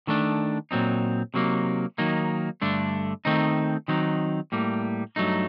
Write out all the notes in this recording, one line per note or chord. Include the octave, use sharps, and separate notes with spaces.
D#3 A3 D4
A#2 F#3 C4 D#4
C3 F#3 A#3 D#4
D#3 F#3 A#3 D#4
G2 D3 A3 D4
D#3 A3 C4 D#4
D#3 F#3 C4 D#4
A2 G3 A#3
G2 F#3 A3 D#4